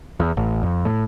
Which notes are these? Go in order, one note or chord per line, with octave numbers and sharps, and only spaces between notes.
E2
A1
F2
A2